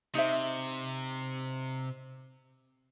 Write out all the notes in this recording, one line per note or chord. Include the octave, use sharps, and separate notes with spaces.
C3 D#4 C5 E5